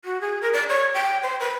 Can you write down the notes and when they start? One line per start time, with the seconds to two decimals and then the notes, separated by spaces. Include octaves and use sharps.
0.05 F#4
0.21 G#4
0.41 A#4
0.53 D5
0.69 C#5
0.94 G5
1.22 C5
1.40 B4